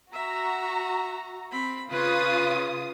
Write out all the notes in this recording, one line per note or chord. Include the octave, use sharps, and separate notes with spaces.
F#4 E5 A#5
C4 B5
C#3 F4 B4 C#5 D#6